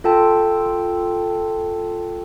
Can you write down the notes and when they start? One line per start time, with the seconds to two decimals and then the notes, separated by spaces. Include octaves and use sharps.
0.04 F4 A4 G5 A5